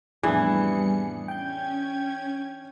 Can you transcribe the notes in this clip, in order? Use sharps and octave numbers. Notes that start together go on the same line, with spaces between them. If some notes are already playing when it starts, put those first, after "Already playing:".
F2 A2 E3 G3 B3 D4 G#4 C#7
C#4 G5 G6 G#6